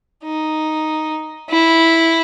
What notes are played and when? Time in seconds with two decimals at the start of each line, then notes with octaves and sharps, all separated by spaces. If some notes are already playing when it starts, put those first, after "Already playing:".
0.24 D#4
1.49 E4